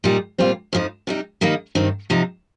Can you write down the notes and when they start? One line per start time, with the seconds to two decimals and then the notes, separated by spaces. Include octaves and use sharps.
0.04 A#2 G3 D#4
0.38 A#2 G3 C4 F4
0.73 F2 F3 D#4
1.07 C3 G3 D#4
1.41 D#3 G3 A#3 D#4
1.75 G2 D#3 C4 D#4
2.10 C3 F3 D#4